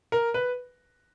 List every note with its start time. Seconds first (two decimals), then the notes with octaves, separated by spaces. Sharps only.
0.12 A#4
0.34 B4